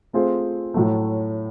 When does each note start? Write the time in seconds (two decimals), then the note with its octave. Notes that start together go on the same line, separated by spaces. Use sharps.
0.13 A3 C4 F4 G#4 C5
0.74 A2 F#3 A3